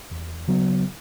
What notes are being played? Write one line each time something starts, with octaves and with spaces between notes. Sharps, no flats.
E2
C#3 F#3 B3